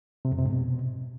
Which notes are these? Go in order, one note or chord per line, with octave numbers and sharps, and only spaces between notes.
C3
F2
C3
G#2
B2